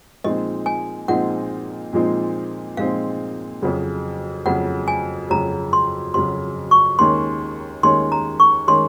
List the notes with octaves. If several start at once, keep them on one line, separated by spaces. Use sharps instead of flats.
A#2 F3 G#3 C4 D#4 D#5
G#5
A#2 F3 G#3 C4 D#4 F#5
A#2 F3 G#3 C4 D#4
A#2 F3 G#3 C4 D#4 F5
F2 C#3 F#3
F2 C#3 F#3 F#5
G#5
F2 C#3 F#3 A#5
C6
F2 C#3 F#3 C6
C#6
D#2 D#3 G#3 C#4 C6
D#2 D#3 G#3 C#4 C6
A#5
C#6
D#3 G#3 C#4 C6